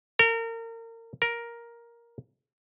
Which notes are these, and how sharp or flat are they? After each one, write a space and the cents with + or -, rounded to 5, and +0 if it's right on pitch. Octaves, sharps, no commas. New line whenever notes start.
A#4 -30
A#4 +10